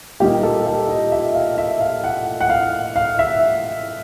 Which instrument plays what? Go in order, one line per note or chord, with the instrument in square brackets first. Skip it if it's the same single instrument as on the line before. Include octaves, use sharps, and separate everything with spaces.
[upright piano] A#2 G3 A#3 D#4 G4
A4
A4
D#5
E5
F5
E5
F5
F#5
F#5
F5
F5
E5